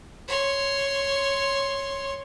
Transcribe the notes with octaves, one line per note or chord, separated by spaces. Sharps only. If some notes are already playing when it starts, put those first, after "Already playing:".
C#5 C6